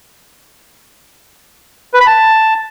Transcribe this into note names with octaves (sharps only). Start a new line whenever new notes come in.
B4
B5
A5